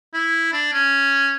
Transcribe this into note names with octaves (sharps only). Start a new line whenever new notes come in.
E4
D4
C#4